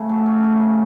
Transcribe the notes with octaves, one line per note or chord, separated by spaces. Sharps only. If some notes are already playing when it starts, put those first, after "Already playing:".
Already playing: A2 C#3 A3 C#4
F#3
C#4
C#3
C#3